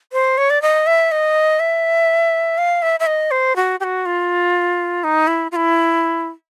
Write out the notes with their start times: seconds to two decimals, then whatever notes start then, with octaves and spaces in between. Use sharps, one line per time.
0.13 C5
0.38 C#5
0.50 D5
0.62 D#5
0.87 E5
1.11 D#5
1.60 E5
2.58 F5
2.82 E5
3.00 E5
3.06 D#5
3.31 C5
3.56 F#4
3.80 G4
3.84 F#4
4.06 F4
5.04 D#4
5.27 E4
5.52 F4
5.56 E4